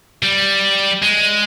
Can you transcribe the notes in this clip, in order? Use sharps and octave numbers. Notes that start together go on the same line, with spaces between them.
G3
G#3